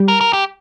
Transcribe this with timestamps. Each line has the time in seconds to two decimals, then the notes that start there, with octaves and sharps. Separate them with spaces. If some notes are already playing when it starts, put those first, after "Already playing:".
Already playing: G3 G4
0.08 A#4
0.21 A#4
0.33 G4